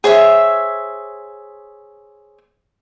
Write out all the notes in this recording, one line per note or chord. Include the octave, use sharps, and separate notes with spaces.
G#4 C5 C#5 E5